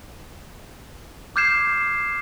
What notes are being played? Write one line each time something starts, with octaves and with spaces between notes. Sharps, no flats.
D6 F6 G6 G#6 C7 E7